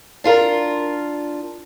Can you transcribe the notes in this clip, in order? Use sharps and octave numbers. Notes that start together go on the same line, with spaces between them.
D4 F4 A#4